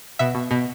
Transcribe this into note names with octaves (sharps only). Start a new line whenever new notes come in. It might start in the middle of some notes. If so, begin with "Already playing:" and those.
B2 E5
B2
B2